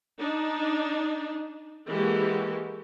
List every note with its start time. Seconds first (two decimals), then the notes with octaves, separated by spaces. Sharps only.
0.20 D4 D#4
1.88 E3 G#3 A#3 F#4 G4 A4